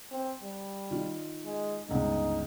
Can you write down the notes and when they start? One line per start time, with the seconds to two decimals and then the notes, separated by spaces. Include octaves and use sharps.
0.12 C4
0.43 G3
0.91 D#3 F4
1.45 G#3
1.89 G1 C#2 D#4